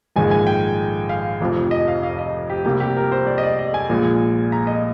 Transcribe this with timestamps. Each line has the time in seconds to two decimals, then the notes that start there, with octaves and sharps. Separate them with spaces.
0.16 A#1 G#2 D#3 G#3 G#5
0.31 G#5
0.47 G5
1.09 F5
1.41 F1 F2 C3 F3
1.71 D#5
1.88 F5
2.03 F5
2.19 D#5
2.50 G4
2.64 C2 C3 G3 A#3 G4
2.80 G4
2.97 A#4
3.12 C5
3.27 D5
3.38 D#5
3.43 D5
3.59 D#5
3.74 G#5
3.89 A#1 A#2 G#3
4.52 A#5
4.67 D#5